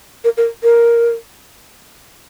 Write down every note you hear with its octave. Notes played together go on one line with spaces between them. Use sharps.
A#4
A#4
A#4